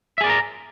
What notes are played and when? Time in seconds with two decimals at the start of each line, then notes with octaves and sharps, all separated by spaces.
0.18 E5
0.21 G#4
0.24 D5
0.27 A#4
0.29 A#5